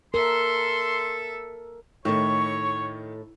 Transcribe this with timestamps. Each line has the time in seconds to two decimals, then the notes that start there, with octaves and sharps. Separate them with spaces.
0.14 A4 A#4 E5 C6
2.05 A2 D#3 A3 C#5 C#6